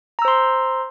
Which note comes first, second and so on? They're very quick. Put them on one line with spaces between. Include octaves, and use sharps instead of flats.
A#5 E6 C5 C6